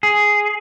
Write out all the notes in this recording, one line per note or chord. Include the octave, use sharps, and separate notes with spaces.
G#4